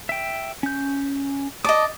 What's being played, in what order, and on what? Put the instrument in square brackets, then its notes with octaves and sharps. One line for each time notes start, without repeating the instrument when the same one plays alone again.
[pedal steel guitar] E5 G5
C#4 G6
[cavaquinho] D5 D#5 [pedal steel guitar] A5 D#6